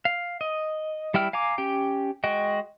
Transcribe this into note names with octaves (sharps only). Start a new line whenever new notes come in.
F5
D#5
G3 E4 G5 F6
F5 G#5 A#5 D6
C#4 G4 G5
G#3 F#4 D#5 G5